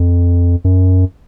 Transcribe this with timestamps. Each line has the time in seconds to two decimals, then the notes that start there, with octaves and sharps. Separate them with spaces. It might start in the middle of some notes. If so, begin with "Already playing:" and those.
Already playing: F2
0.64 F#2